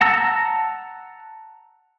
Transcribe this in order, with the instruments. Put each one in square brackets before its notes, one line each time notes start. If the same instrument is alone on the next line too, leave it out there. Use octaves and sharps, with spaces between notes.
[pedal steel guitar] F#5 A5 A#5 E6